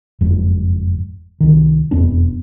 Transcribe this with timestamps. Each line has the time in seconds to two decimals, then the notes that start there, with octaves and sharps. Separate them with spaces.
0.21 F#1 F2 G#2
1.40 C2 D#3
1.91 E1 F2 B3 D4